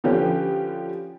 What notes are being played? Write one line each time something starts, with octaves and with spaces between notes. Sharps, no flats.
D3 F3 C#4 G4 B4